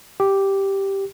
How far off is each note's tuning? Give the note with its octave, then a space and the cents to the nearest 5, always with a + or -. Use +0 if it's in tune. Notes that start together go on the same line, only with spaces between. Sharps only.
G4 -5